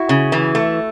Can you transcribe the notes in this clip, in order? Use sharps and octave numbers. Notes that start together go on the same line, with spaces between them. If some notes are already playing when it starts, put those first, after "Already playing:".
Already playing: E4 F#4
C#3
E3
A3